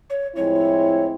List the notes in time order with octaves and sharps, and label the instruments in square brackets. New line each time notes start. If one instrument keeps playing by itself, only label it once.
[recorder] C#5
[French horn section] A2 F3 G#3 C4 E4 [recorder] C#5